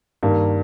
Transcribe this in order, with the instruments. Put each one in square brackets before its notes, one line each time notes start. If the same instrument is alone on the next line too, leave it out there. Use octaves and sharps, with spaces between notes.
[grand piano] G2 D#3 A#3